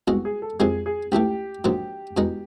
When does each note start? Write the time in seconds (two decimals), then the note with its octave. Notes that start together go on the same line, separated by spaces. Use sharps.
0.07 C2 B2 G#3 F#4
0.25 G#4
0.42 A4
0.59 F2 C3 D#3 G#3 G#4
0.86 G#4
1.12 C#2 C#3 E3 A3 G4
1.64 A#1 G#2 D#3 F#3
2.17 E2 B2 G#3 B3 D#4